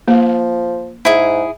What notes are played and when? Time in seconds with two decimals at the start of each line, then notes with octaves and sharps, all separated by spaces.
0.08 F3 A#3
1.05 G#2 E4 G#4